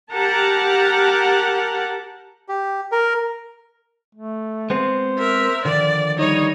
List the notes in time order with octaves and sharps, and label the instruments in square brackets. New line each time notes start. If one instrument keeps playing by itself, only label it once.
[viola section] G4 A#4 F#5 A5 A#5
[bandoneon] G4
A#4
[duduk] A3
[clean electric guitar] G#3 B3 C4 [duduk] C5
[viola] A#4 E5
[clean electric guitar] D3 D#3 F3 [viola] D5
[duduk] G3 [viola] D#4 C#5